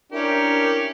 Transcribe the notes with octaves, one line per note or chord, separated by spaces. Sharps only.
C#4 D4 E4 G4 A#4